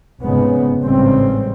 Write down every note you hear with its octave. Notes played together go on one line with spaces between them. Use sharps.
F1 G#2 C#3 G#3 B3
A1 G#2 C#3 G3 C4